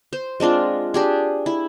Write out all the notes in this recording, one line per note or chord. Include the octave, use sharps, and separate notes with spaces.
C5
G#3 C4 D4 F4
D4 G4 G#4
E4